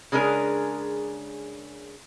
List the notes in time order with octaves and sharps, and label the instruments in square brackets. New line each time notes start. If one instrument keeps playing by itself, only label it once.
[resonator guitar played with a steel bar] C#3 G#3 D4 G#4 A#4